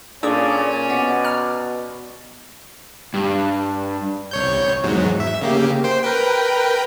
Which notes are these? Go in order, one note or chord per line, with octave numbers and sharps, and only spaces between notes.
A#2 C#4 D4 G#4 A4 D5
B2 B3 D5
A#5 F6
G2
C2 C#5 G6
E2 G#2 F#3
E5
C#3 A#3 G4
C5 G5
A#4 B4 G5